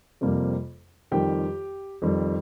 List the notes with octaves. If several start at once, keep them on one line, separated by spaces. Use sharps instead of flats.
F2 C3 G3 A#3
F2 D#3 G3 G4 G5
F2 D#3 G3